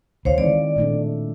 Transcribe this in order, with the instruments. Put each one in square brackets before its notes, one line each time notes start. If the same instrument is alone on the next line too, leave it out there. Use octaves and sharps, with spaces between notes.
[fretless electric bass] D2 [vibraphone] C5 C#5 F5
[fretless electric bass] D#3 E3 C4 [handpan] G#3 [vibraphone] D5
[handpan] A#2 A3 D4